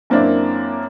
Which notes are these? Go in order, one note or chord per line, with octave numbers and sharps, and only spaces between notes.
F#2 A#3 C4 D4 E4